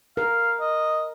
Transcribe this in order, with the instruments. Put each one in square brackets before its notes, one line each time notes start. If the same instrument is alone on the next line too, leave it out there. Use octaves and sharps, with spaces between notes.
[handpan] A#4 [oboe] F5
[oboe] D#5